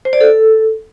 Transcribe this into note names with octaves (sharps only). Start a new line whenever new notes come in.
C5
D5
A4